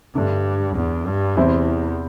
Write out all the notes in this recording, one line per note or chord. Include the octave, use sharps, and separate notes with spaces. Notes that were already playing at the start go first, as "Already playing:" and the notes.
G2 D3 A3 D4
E2
G2
E2 C3 E3 C4 E4